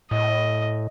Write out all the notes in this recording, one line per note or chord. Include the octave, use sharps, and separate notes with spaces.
A2 D#5